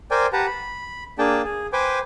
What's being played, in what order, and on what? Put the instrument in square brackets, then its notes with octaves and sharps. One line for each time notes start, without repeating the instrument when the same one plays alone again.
[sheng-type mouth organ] A#4 C5 D5 G5 G#5
G4 B4 F#5 A5 A#5
B5
A#3 D4 G#4 G5 A5
G#4
B4 C5 G5 G#5 D6